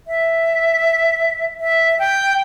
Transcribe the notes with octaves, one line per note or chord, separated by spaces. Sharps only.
E5
E5
G5